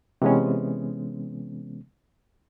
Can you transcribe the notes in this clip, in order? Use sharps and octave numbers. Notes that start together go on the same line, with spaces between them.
C3 E3 G#3 B3 C#4